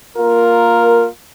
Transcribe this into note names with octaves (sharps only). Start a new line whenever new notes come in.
A#3 F4 A#4